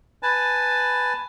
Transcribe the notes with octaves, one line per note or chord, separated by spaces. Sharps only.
B4 G#5 A5